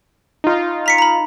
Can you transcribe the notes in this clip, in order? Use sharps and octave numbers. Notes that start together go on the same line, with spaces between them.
D#4 F4
A#5 B6 C#7
A#5 B5